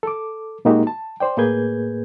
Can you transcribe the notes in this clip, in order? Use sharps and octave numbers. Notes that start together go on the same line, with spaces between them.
A4 D6
A#2 G#3 A#3 D#4 F#4 G4
A5
C5 D5 G5
A2 A#3 G#4 B4 G6 G#6